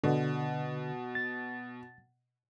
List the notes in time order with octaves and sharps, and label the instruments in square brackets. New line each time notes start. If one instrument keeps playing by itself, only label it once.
[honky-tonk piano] B2 [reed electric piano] D3
[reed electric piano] A6